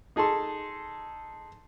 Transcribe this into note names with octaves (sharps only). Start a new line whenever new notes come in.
D#4 G#4 A4 A5 C6